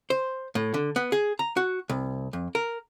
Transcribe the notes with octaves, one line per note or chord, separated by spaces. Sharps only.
C5
A2
D3
B3
G#4
A#5
F#4
C2
F2
A#4